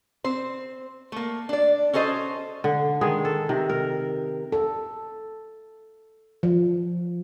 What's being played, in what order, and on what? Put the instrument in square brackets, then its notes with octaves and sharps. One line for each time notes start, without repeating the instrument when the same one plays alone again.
[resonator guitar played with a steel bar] C4 C5
A3 A#3
D4 D5
C#4 F#4 A4 C5 D#5
[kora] D3
D#3 G#3 G#4
A4
C3 D#3
A#4
[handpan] A4
F3